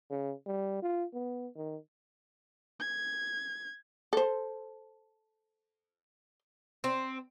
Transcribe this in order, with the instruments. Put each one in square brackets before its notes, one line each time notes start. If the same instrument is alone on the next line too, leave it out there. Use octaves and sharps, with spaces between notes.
[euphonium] C#3
G3
F4
B3
D#3
[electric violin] G#6
[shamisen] A4 C5
[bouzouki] C4